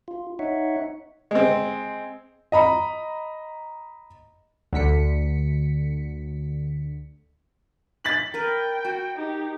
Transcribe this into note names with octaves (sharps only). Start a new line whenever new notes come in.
F4
D#4 C#5 E5 F#5
G#3 C4
D#5 A#5 B5
D2 D3 B6 C#7
A6 B6 F#7
A#4 B4 G5
F#4
D#4 G4